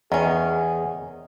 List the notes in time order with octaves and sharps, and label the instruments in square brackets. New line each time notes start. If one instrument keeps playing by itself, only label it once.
[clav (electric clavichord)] E2 [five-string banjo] D#3 C#4 [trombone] G#4